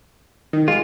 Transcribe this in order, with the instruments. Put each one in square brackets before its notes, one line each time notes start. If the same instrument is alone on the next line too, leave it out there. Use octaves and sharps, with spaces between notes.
[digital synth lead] D#3
[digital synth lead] G#3 [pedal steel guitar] F4